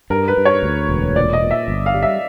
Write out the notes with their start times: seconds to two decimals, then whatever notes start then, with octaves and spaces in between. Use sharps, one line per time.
0.10 G2 A#4
0.28 B4
0.37 G2
0.45 C#5
0.63 D2
0.89 E1
1.16 A#2 D5
1.33 D#5
1.42 A#2
1.51 E5
1.68 G1
1.86 F5
1.94 G3
2.03 E5